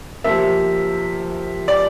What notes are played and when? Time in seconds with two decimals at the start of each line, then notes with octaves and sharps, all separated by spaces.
0.24 C3 F3 A#3 E5
1.68 D5